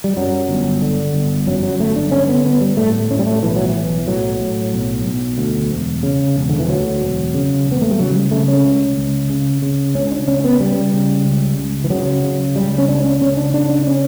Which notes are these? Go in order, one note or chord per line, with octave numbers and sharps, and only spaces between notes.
G3
F#2 F#3
G1
D3
G1
F#2 F#3
F#3
G1 A3
D4
D3 C#4
B3
G1 B3
G3
A2 A3
A2 C#4
G3
A3
B1 E3
F#3
E3
B1
A2 F#3
A2
B1
B1
D2
E1
C#3
E1
D3
E3
D2 F#3
E1
C#3
E1
B3
A3
G3
C#3 F#3
G3
C#3 A3
C#4
C#2
C#2
C#3
C#3
C#2 C#4
D4
C#2 C#4
B3
C#3 G3
C#3
C#2
C#2
E3
C#3 F#3
C#3
C#2 G3
C#4
C#2 D4
C#4
C#3 C#4
D4
C#3 D4
D4
C#4